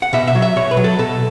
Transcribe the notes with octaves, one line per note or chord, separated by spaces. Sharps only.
F#5
B2 E5
E5
F#3
E5
B2 C#5
B4
F#3
A4
B2 A4